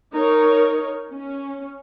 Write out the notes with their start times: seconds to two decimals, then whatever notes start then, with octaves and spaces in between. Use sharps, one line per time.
0.13 D#4 A#4 C#5
1.10 C#4